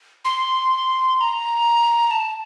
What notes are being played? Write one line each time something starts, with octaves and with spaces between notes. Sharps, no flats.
C6
C6
A#5
A#5
A5